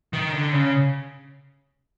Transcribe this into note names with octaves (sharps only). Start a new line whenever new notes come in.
D#3
D3
C#3